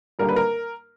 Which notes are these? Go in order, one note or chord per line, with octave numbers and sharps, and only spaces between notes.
G#1 G2 D3 G3 A#3 A#4
B4
A#4